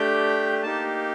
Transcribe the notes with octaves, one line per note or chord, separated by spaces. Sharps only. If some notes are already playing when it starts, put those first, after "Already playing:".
Already playing: A3 D4 G4 G5
A#3 D#4 G4 A5